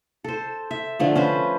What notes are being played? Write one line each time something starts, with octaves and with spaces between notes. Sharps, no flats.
A4 C5
E5
D3 F3 A3
C#4 B4 C5